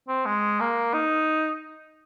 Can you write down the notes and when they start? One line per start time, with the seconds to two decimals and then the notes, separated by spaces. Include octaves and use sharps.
0.08 C4
0.26 G#3
0.60 A#3
0.94 D#4